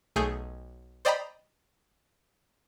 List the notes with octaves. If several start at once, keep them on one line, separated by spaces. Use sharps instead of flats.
B1 A3 G#4 G6
C5 D5 D#5 G5 A#5 B5